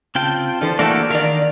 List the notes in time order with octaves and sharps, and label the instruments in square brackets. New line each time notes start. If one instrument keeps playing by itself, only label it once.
[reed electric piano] C#3 A5 [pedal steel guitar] C4 F4 G5
[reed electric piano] E3 D4 [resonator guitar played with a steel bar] F3 A4 C5
[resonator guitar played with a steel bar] A3 E4 D5 [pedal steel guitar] A#3 F#4 A4
[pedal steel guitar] D#3 F5 [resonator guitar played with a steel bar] A#4 D5